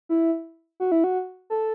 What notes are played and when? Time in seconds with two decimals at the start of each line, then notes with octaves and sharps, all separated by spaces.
0.09 E4
0.80 F#4
0.92 E4
1.04 F#4
1.50 A4